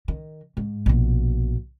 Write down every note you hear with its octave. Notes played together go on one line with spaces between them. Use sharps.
D#3
G#2
A#1 B2